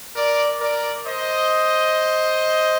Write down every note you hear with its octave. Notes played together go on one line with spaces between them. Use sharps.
A#4 D5
A#4 D5
C5 D#5